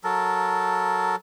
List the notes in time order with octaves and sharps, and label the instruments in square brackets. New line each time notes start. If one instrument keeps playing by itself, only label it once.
[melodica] F#3 A4 A#4